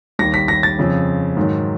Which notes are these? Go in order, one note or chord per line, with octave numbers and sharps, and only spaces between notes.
D#2 D#3 G3 A#6
B6
A#6
A6
F2 C#3 F3
G#2 D#3 F#3